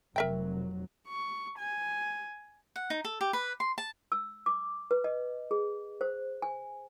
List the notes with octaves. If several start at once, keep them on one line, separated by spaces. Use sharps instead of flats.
F1 F#3 A#4 E5 G5
C#6
G#5
F#5
D#4
A4
G4
B4
C6
A5
E6
D6
B4
D#5
G#4
C5
G#5